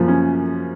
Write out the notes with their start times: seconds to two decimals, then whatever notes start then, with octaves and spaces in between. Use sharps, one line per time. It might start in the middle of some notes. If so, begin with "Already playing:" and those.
Already playing: F#2 F3 A#3
0.08 C#4